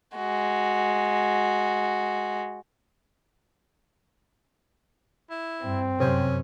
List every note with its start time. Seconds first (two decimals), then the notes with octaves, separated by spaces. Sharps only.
0.16 G#3 F#4
5.31 E4
5.63 G2 C4
6.00 F#2 C3 C#4 C5